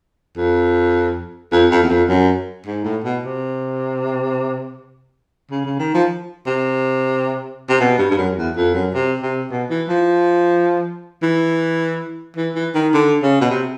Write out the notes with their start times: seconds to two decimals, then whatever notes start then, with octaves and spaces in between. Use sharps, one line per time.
0.37 F2
1.52 F2
1.71 F2
1.83 E2
1.90 F2
2.09 F#2
2.66 G#2
2.84 A2
3.04 B2
3.23 C3
5.51 C#3
5.65 C#3
5.79 D#3
5.94 F3
6.47 C3
7.69 C3
7.80 B2
7.98 G2
8.11 G2
8.18 F#2
8.37 E2
8.57 F2
8.74 F#2
8.94 C3
9.23 C3
9.51 B2
9.70 E3
9.89 F3
11.23 E3
12.37 E3
12.55 E3
12.75 D#3
12.94 D3
13.23 C#3
13.41 B2
13.51 C3